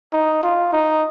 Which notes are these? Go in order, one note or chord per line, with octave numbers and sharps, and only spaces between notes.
D#4
F4
D#4